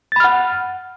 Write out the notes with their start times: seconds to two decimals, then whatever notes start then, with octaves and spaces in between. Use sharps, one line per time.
0.12 A6
0.16 B5
0.20 F6
0.24 F#5